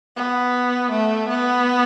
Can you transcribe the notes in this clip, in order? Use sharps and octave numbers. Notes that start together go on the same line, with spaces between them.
B3
A3
B3